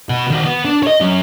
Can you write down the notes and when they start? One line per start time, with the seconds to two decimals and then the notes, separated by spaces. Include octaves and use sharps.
0.09 B2 F#4
0.30 D#3 F#4
0.45 B3
0.65 D4
0.83 C#5 D#5
1.01 F#2 F#3